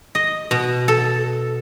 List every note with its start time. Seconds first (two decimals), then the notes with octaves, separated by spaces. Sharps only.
0.15 D#5
0.51 B2
0.88 A4